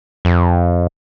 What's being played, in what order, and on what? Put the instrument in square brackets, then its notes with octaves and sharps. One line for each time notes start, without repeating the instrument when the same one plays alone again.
[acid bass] F2